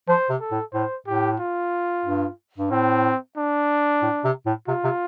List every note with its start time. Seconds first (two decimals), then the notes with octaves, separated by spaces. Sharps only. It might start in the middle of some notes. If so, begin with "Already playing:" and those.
0.08 F3 C5
0.29 C3
0.41 A4
0.52 A2
0.73 A2 C5
1.07 A2 G4
1.40 F4
2.05 G2
2.58 G2
2.71 A2 C4
3.37 D4
4.02 A2
4.24 C3
4.46 A2
4.68 C3 F4
4.84 C3